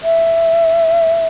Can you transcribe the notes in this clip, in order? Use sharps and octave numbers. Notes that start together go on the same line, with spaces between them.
E5